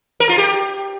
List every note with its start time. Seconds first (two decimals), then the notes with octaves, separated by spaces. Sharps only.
0.20 A#4
0.29 F4
0.38 G4